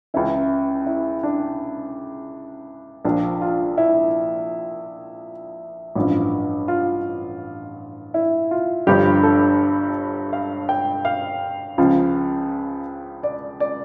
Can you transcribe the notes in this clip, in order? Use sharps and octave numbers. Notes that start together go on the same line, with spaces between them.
C#2 C#3 E3 E4
E4
D4
A#1 A#2 F3 D4
F4
E4
A1 G2 F3
F4
E4
F4
G1 G2 D3 F3 G4
A4
F5
G5
F5
C#2 C#3 F3
D5
D5